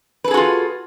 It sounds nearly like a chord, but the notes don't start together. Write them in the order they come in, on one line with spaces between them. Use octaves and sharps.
B4 A4 G#4 F#4 F4